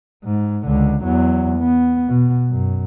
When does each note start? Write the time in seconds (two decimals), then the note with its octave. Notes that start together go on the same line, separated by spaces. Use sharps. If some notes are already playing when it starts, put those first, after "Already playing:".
0.24 G#2
0.66 C#2 D3
1.04 E2 F#3
1.60 B3
2.08 B2
2.51 F#2